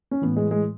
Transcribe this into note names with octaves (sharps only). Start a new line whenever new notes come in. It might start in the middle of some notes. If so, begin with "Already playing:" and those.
C#4
A2 E3 B3
G#3
G#3